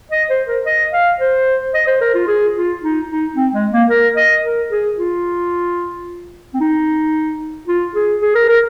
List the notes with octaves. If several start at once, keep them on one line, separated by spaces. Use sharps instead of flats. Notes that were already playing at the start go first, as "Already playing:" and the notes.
D#5
C5
A#4
D#5
F5
C5
D#5
C5
A#4
F4
G#4
F4
D#4
D#4
C4
G#3
A#3
A#4
D#5
A#4
G#4
F4
C4
D#4
F4
G#4
G#4
A#4
A#4